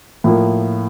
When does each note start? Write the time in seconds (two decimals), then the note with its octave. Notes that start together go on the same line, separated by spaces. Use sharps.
0.24 A2 F3 A#3